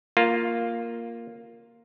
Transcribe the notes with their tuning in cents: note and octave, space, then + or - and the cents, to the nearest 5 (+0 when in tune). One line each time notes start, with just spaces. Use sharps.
A#3 +0 F4 +0